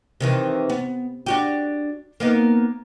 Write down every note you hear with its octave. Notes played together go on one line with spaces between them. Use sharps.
C3 D#3 E3
B3
D4 F#4 G4
A#3 B3 D#4